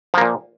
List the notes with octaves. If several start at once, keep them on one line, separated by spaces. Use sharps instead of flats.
A#2 F3 A#3